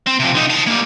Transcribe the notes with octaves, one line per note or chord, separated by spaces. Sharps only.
C4
C3 F3
D3 D#4
F5 A5
G3 A#3